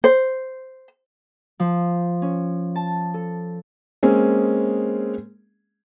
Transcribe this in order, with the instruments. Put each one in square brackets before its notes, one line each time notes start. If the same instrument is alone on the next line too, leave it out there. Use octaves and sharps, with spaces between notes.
[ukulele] C5
[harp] F3
C#4
A5
A4
[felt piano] G#3 A#3 C4 C#4 G#4